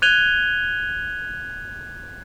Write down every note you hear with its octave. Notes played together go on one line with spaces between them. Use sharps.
F#6 G#6 D#7 F7 G7